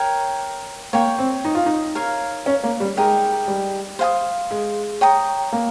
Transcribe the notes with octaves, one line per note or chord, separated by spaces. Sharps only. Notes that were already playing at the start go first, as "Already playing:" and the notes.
Already playing: A#4 C#5 G5
A#3 C#5 G5 C#6
C4
D#4
F4
D#4
A#4 C#5 F5
C#4
A#3
G3
G#3 D#4 G4 A#4
G3
C5 F5 G#5 D#6
G#3
C#5 G5 A#5 D#6
A#3